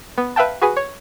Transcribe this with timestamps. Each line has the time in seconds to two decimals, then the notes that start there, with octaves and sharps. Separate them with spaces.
0.18 B3
0.36 B4 E5 F5 G5 A5
0.62 F#4 G#4 B4 G#5
0.77 C#5